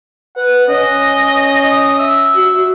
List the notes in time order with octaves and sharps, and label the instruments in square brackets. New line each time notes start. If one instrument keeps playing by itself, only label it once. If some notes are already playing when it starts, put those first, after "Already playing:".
[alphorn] B4 [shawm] F#5
[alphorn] C#4 [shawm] D#5
[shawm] D#6
E5
[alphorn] F#4